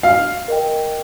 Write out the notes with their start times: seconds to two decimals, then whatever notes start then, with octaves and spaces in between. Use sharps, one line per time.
0.03 F#4 F5
0.48 A#4 D#5 G5